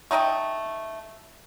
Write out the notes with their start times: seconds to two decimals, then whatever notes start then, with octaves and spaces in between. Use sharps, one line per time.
0.11 A3 D#4 D#5 G5